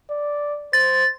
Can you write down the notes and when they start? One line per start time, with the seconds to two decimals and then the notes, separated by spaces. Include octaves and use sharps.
0.10 D5
0.73 C5 A6